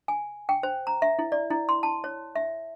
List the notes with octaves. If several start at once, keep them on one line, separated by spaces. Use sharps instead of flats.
G#5
G5
C5
A#5
E5
E4
D5
E4
C6
A5
C#5
E5